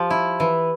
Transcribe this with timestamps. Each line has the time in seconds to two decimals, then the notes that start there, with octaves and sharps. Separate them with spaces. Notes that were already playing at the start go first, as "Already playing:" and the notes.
Already playing: F3 G4
0.10 E4
0.40 E3